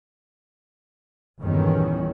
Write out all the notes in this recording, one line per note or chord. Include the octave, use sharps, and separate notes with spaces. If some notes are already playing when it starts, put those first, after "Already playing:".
G1 E2 A#2 D#3 E3 C#4